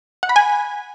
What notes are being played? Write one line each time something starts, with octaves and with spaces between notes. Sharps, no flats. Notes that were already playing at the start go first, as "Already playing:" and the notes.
F#5
B5
G#5